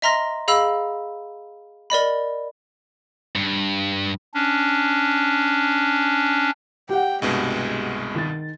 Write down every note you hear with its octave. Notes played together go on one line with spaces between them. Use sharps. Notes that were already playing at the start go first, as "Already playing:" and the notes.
D#5 E5 A#5 C6 F6 A#6
G#4 D#5 F5 B5 E6
A#4 D5 D#5 B5
G2
C#4 D4
G4 F#5 G5
C2 G2 B2 G#3
D#3 A6